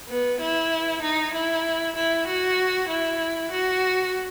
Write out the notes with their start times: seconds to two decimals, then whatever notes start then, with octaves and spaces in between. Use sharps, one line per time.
0.09 B3
0.40 E4
1.03 D#4
1.33 E4
1.96 E4
2.27 F#4
2.89 E4
3.51 F#4